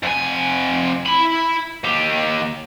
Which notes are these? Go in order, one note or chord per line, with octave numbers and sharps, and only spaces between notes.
F2 G#5
E4 B5
D#2 G4